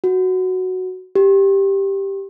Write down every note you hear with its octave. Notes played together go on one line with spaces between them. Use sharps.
F#4
G4